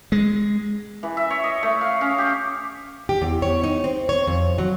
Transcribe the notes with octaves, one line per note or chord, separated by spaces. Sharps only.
G#3
E3
E5
C#5
D#5
A3
F5
C#4
G4
G4
E2
C#5
D#4
C4
C#5
F2
F#3